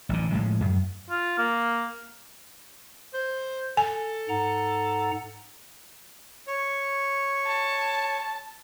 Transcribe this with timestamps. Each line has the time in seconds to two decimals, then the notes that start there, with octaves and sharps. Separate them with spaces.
0.09 A1 D3
0.32 A2 F3 G#3
0.61 F#2
1.11 F4
1.38 A#3
3.14 C5
3.77 A4 G#5
4.29 G#2 F#5 A#5
6.48 C#5
7.47 A5